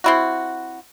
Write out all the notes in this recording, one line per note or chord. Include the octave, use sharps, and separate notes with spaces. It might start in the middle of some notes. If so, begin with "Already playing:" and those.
C4 E4 F#4